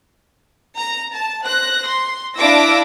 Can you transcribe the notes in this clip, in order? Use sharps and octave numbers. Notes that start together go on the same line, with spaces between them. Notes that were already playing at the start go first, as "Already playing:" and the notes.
A#5
A5
C5 F#6 A#6
C6
D4 E4 F5 D6 E6 A#6